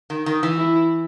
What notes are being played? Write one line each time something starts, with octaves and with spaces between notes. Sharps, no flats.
D#3
D#3
E3
E4